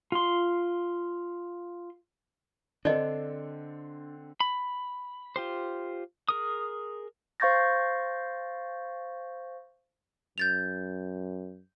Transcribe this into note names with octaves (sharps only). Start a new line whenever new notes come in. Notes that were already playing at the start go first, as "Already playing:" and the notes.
F4 C6
D3 C4 D4 A4 D5 D#5
B5
F4 G4 C5
G#4 A#4 D#6
C5 F5 C#6 G6 A6 A#6
F#2 G6 A6 F7